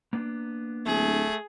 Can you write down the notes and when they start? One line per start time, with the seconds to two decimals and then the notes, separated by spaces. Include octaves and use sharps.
0.13 A#3 B3 D4
0.86 D1 A3 G#4